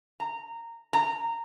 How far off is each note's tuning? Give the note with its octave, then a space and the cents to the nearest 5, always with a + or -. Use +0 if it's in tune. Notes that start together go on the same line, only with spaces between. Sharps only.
A#5 -15
A#5 -15